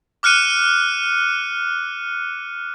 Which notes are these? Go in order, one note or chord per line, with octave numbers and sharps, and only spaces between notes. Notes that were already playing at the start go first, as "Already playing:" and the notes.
D6 F6 F#6 C#7 D#7